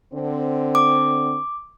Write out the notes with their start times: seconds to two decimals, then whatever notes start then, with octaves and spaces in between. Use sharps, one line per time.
0.14 D3 C4
0.75 D6